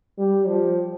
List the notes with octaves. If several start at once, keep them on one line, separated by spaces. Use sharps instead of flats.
G3
F3